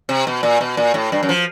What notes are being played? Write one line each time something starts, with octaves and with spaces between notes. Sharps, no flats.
C3
B2
A#2
B2
A#2
A2
G2
F#2
F3